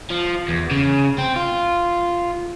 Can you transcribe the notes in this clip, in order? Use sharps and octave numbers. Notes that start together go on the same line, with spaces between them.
F3
E2
C#3
C4
F4